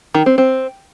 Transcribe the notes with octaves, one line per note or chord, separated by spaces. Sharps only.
D#3
C4
C4